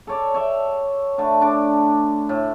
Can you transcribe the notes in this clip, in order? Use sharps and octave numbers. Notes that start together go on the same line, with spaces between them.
A4 C#5 D5
C#5 E5 G5
D3 A3
D3 D4 D6
A2